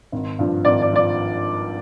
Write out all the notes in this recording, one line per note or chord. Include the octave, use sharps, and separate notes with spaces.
G#1
G2 F3
G#1 D5
D5
F3 D5